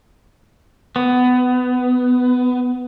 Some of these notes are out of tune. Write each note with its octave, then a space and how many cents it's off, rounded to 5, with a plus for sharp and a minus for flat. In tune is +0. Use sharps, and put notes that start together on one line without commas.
B3 +20